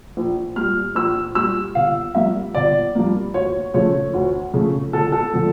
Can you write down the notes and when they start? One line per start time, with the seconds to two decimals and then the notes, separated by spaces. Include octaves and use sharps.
0.17 A#1
0.56 A#2 G3 F6
0.95 A#1 E6
1.35 A#2 G3 E6
1.75 G1 F5
2.15 G2 F3 A#3 E5
2.55 G1 D5
2.95 G2 F3 A#3
3.34 D2 C#5
3.74 C#3 F3 A3 C#5
4.14 D2
4.53 C#3 F3 A3
4.93 G1 A4
5.12 A4
5.33 D3 F3